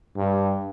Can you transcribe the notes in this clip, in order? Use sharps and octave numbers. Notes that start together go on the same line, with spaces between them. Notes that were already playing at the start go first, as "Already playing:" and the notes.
G2